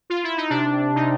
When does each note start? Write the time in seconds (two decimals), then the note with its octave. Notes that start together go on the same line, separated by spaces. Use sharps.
0.10 F4
0.24 E4
0.37 D#4
0.49 C3 D4
0.95 C3 D#4